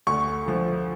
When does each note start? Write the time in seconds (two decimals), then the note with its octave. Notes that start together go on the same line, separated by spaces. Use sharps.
0.07 D2 C#6
0.46 D3 F3